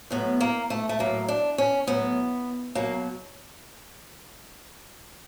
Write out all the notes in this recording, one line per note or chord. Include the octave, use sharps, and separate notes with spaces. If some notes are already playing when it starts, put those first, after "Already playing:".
A2 F#3 B3
A#3
A3
A3
A2 F#3 A#3
D4
C#4
A2 F#3 B3
B2 F#3 A#3